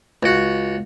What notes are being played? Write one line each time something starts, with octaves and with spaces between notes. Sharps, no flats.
C#2 F#4